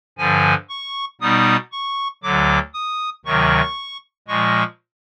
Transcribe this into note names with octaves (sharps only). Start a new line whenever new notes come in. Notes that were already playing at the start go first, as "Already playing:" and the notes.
G2 D3 F3 G#5
C#6
B2 G3 B3 D#4 D#6
C#6
D2 D3 F#3 D6
D#6
D2 C3 D#3 F#3 C#6
A#2 F3 G#3 C#6